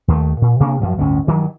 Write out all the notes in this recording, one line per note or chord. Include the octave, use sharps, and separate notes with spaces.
D#2 D#3 G3 A3
A#2
C3 A#3 D4
F#2 F3 F#3
G1 D2 A2 C#4
G2 D#3 E3 F#3